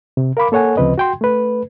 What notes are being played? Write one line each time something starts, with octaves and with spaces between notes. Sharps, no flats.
C3
A#4 F5 B5 D6
A#3 A4 C#5 F#5 G#5
D2 C#3 F3 C4 B4 D#5
F#4 G5 C6
A3 B4